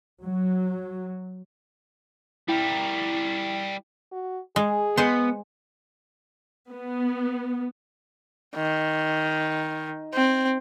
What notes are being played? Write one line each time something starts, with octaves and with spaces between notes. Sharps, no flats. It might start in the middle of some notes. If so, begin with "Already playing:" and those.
F#3
G3 E4 A#4 G5
F#4
G#3 G#4
G#3 B3 C5
B3
D#3
C4